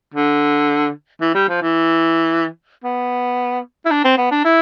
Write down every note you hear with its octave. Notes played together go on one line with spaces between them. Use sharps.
D3
E3
G3
F3
E3
B3
E4
D4
C4
B3
D4
E4